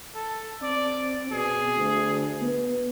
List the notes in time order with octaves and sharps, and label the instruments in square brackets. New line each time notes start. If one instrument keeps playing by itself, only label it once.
[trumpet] A4
[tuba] C4 [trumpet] D5
[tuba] B2 [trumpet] G#4
[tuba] D2
B3